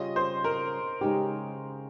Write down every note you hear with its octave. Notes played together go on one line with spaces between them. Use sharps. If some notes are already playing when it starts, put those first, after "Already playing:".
Already playing: C#3 G3 C#4 F4 D#5
C5
A#4
C#3 G#3 D#4 G4